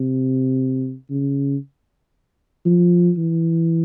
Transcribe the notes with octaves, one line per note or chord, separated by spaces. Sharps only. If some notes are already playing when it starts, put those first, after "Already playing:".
Already playing: C3
C#3
F3
E3